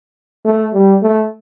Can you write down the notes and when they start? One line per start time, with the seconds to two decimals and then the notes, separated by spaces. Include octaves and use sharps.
0.45 A3
0.74 G3
1.03 A3